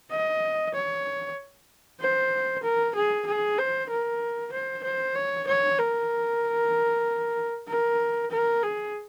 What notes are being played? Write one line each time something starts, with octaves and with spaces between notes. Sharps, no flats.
D#5
C#5
C5
A#4
G#4
G#4
C5
A#4
C5
C5
C#5
C#5
A#4
A#4
A#4
G#4